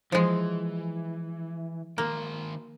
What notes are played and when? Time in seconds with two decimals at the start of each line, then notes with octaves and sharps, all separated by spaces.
0.12 E3 F3 G#3
1.98 D#3 A#3 C5